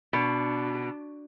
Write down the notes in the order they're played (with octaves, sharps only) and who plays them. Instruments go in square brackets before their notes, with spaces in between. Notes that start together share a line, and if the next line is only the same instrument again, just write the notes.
[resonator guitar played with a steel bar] B2 [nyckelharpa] D4